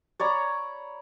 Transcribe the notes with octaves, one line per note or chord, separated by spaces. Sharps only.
C#5 D5 A#5 B5